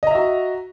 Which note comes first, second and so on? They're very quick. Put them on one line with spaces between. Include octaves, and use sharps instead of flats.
D#5 A#5 E5 F#4